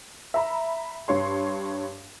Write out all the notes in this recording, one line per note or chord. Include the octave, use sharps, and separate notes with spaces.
E5 A#5 B5
G2 C#5 C6